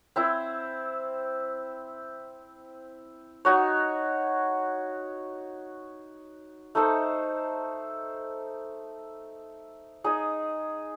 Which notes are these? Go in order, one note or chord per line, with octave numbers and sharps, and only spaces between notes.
C4 E4 C5
D#4 F#4 C#5
A3 D#4 A4 C5
D#4 G#4 D#5